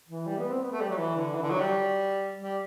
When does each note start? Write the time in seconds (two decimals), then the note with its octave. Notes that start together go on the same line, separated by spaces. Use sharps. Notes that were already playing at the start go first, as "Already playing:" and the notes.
0.09 E3
0.26 G3
0.39 B3
0.50 C4
0.62 B3
0.72 A3
0.81 G3
0.90 F#3
0.98 E3
1.16 D3
1.34 E3
1.43 D3
1.51 F#3
1.60 G3
2.41 G3